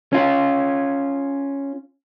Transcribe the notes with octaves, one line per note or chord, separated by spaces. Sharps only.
C#4 F4